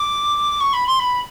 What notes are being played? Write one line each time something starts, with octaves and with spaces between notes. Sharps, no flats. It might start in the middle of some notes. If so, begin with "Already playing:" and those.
Already playing: D6
C#6
B5
C6
B5